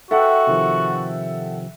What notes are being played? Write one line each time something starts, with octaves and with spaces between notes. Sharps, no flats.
F#4 A4 E5 F#5 G5
C3 D#3 F3